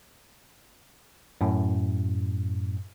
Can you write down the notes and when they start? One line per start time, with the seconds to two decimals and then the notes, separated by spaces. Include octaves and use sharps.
1.41 F#2 A2